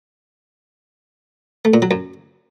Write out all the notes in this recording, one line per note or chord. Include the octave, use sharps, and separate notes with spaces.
A3
A#2
F#3
F#2